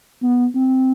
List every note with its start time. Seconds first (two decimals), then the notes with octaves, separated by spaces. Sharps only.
0.23 B3
0.55 C4